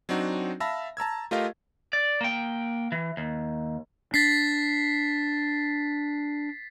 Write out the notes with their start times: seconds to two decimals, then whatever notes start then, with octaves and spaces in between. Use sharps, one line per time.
0.09 F#3 C4 D4 D#4 F#4
0.60 E5 F5 A5 B5 E6 A#6
0.97 A5 A#5 E6 G#6
1.31 A3 F4 G4 A#4 D#5 F5
1.93 D5
2.21 A#3 G5
2.92 E3
3.17 D#2
4.14 D4 A6 B6 C7